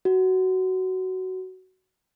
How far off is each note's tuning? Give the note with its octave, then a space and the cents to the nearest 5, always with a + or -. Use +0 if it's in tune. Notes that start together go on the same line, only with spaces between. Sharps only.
F#4 +15